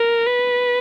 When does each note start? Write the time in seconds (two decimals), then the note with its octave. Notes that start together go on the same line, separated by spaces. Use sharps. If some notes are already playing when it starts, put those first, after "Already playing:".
Already playing: A#4
0.26 B4